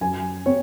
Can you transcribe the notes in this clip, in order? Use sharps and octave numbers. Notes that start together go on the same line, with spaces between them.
F#2 G#5
C4 C#5